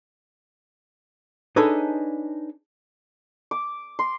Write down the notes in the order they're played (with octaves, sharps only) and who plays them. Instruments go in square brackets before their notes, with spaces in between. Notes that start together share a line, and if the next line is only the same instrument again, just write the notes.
[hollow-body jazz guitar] D4 D#4 G#4 A4 B4 C#5
[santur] D6
C6